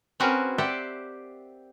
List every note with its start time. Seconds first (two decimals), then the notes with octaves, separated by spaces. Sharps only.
0.20 C4 C#4 F#4 G#4 A#4 B4
0.58 G4 C5 D5 E5 F#5 G5